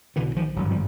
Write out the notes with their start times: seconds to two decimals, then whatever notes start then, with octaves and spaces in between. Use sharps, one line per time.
0.16 B1 B2 D3 E3
0.36 D#3 F3
0.56 G#1 G2 D3 F#3
0.70 F3 G3